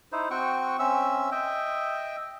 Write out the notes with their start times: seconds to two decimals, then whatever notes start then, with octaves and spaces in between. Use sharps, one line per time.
0.12 D#4 E4 C5
0.31 C4 F#4 G5 C#6
0.79 C4 C#4 E5 E6
1.32 D#5 E5 G5